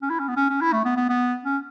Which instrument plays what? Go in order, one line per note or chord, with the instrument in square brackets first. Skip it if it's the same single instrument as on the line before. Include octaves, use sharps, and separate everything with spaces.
[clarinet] C#4
E4
C#4
B3
C#4
C#4
E4
A3
B3
B3
B3
C#4